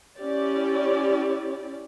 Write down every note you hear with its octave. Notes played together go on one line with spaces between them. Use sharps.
C#4 E4 G4 D5